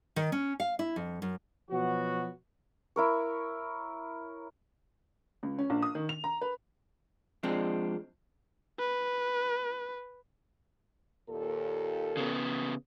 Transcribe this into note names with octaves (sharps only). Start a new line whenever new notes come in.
D#3
C#4
F5
E4
F2
F#2
B2 F3 F#3 B3 F#4
E4 A#4 C#5
C#2
C#4
A#1
D#6
D#3
F7
A#5
B4
F3 G#3 C4 D4
B4
D#2 A#2 A4
C#3 B3